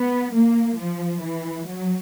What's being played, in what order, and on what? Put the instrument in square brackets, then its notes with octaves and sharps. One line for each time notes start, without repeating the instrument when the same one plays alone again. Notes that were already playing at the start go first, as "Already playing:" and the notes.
Already playing: [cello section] B3
A#3
F3
E3
F#3